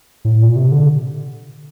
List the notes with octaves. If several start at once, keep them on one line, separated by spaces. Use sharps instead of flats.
A2
A#2
C3
D3